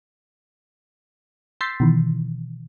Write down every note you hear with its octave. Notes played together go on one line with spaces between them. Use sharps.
C6 E6 G6 A6 B6 C7
B2 D#3 E3